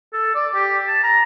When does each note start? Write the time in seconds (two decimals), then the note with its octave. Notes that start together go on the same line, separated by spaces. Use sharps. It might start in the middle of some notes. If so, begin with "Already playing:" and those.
0.13 A4
0.35 D5
0.55 G4
0.87 A5
1.03 A#5